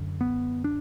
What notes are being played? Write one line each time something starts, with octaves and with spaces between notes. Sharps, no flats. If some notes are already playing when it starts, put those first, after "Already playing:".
Already playing: F#2 D3
B3
D4